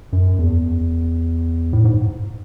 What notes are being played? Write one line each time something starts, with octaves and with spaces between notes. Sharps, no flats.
F#2
E2
A2
G#2